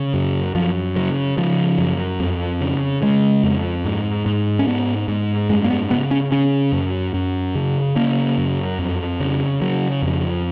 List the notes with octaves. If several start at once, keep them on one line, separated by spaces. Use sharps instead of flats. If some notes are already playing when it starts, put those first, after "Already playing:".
Already playing: C#3
F#2
F#2 F3
C#3 F#3
C#3 F3
F#2
F2
C#3
C#3 G#3
F2
G#2
G#2
C#4
G#2 B3
G#2
F#2 G#3
A#3
B3
C#3 B3
C#4
C#3 C#4
F#2
F#2
C#3
C#3 A#3
F#2
F2
C#3
C#3 F#3
F2